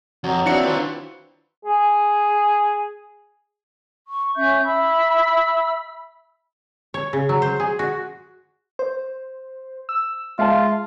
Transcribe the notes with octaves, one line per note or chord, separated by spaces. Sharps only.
F2 F#3
F3 F#3 C4 D4 E4 C#7
D#3 C4 B4
G#4
C#6
C#4 E5 C#6 G6
E5 B5 E6
C#5
C#3
F#3
C5
G#4
F#4
C5
E6
G#3 F4 E5 F5 A5